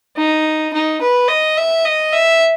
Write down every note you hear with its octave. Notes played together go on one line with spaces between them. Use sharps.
D#4
D#4
B4
D#5
E5
D#5
E5